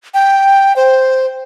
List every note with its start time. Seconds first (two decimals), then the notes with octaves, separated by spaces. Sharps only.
0.14 G5
0.76 C5